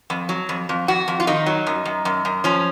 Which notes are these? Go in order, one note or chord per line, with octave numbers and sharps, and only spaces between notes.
F2
F#3
F2
F2
F2 F#4
F2
F4
D#3 D#4
F#3
F#2
F#2
F#2
F#2
F3 C#4